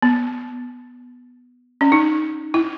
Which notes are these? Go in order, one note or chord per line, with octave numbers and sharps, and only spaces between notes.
B3
C#4
D#4
E4